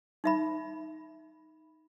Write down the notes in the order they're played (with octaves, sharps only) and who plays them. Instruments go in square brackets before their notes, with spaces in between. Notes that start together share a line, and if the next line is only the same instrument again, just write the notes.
[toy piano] D#4 E5 B5